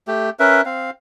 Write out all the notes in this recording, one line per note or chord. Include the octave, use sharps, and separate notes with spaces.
A3 G4
C#4 A#4 B4 E5
C4 F5